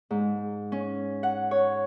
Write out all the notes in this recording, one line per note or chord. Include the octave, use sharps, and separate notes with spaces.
G#2
C#4
F#5
C#5